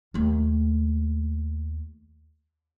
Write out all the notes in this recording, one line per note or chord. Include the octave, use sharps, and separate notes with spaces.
D#2 A3